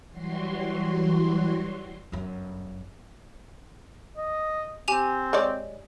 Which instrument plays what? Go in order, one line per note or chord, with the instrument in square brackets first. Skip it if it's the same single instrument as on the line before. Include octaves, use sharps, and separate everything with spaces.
[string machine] E3 F#3 G3 F#4 C6
[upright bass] G1 F#2
[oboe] D#5
[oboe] C4 [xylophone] G4 G#5 F7
[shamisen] G#3 C#5 D5